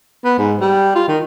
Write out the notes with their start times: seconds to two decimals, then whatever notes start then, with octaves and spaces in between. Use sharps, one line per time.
0.24 B3
0.38 G#2
0.61 G3
0.96 F4
1.08 D#3